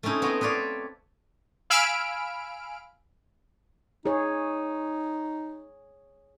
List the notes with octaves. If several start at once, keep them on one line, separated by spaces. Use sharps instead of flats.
A3 C4 C#4 D#4 E4
B3 C4 C#5 D#5
C4 B4 C#5 D5 F5
F5 G#5 B5 E6 F6 D7
D#4 G#4 C#5